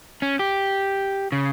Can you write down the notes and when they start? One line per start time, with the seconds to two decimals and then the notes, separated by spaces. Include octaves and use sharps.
0.22 C#4
0.39 G4
1.32 C#3